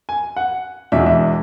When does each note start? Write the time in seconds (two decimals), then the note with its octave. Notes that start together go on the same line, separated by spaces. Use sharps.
0.09 G#5
0.36 F#5
0.92 E2 B2 G#3 D4 E5
1.06 E5